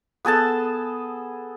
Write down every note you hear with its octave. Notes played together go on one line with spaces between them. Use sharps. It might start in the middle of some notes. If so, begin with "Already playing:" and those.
B3 G#4 A4 A5